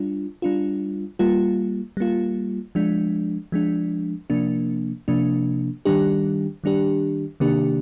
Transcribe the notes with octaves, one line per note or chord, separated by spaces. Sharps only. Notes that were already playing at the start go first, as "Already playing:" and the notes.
Already playing: G3 D4 F4
G3 D4 F4
G3 A#3 F4
G3 A#3 F4
F3 G#3 D4
F3 G#3 D4
C3 F3 A#3 D4
C3 F3 A#3 D4
D#3 G3 D4 G4
D#3 G3 D4 G4
C3 D#3 A#3 D4 G4